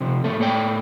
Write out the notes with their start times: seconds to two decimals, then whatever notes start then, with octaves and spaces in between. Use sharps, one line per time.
0.01 C3 F3
0.24 A2 A#3 A4
0.40 A2 A4 D5 G5